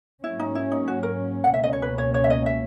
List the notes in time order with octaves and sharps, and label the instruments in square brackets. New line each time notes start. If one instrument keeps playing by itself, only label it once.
[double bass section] G#2 F#3 A#3 C#4 [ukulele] E4
[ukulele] D#4
E4
D#4
F#4
A#4
F#5
[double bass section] C#2 B2 A#3 C#4 [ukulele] E5
[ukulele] D#5
C#5
B4
C#5
C#5
E5
D#5
E5